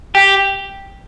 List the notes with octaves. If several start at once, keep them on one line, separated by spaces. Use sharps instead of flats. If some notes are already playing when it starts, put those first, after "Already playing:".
G4